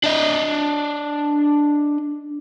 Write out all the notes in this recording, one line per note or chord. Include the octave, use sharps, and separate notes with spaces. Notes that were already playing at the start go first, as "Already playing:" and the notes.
D4 D#5